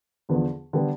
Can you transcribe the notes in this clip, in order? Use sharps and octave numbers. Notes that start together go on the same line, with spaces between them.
E2 D3 F3 B3
D3 G3 B3